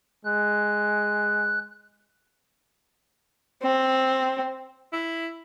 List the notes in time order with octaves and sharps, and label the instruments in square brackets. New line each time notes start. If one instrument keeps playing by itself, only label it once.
[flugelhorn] G#3 [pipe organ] F#6
[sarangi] C4
[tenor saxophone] E4